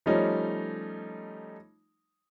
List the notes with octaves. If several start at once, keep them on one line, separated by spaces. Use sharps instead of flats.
F3 G3 A3 C#4 D#4